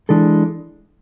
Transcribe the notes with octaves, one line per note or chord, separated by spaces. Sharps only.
E3 G#3 D4 A4